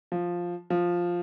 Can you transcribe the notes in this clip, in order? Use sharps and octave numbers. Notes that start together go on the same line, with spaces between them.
F3
F3